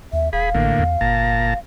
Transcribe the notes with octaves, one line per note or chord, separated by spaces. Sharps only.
D#2 E5
D#1 G#4 F5 B5
A1 A2 D3 A#3
E2
G1 A#2 A5 A#5